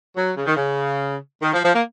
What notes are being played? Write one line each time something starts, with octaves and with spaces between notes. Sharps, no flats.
F#3
C#3
D#3
C#3
D#3
F3
F3
A#3